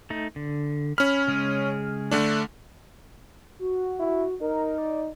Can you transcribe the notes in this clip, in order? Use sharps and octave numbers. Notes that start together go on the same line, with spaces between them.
A3 D#4
D3
C#4 B5 F6
C#3 G#3 G#4
D3 A3 D4
F#4
E4
D#4 A#4
D5